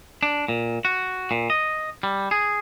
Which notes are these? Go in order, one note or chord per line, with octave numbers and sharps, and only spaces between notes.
D4
A#2
F#4
A#2
D#5
G3
G#4